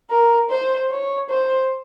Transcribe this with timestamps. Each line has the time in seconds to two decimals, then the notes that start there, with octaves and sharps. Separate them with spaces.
0.10 A#4
0.50 C5
0.91 C#5
1.30 C5